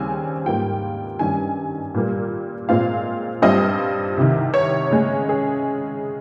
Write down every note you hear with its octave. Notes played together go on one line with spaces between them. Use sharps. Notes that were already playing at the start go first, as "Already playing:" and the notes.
Already playing: D#2 C#3 G3 C4 G#5
G#2 G3 A#3 F4 G5
G2 D#3 G3 C#4 G#5
A#2 G3 A#3
A#2 G#3 C4 F4 F5
G2 G3 C4 F4 D#5
C2 C3 D#3
C#5
C#3 G#3 C#4
G#4